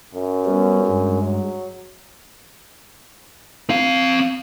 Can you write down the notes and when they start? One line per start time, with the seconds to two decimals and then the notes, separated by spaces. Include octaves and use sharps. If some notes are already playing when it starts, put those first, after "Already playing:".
0.15 F#2
0.45 G3 B3 C#4
0.86 G2 G#3
1.23 F#3
3.69 C4 F5